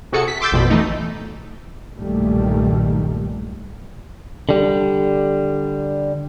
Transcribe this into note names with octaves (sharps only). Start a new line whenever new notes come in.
C3 F#4 G#4 A4 C#7
B6
C6 D6 E6 G6 A6
A1 F2 B2 B5
E3 A3 D#4
B1 G2 A#2 D#3 G3 A3
D3 G3